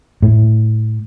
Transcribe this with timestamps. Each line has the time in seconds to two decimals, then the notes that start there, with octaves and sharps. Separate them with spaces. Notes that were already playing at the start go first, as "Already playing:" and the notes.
0.22 A2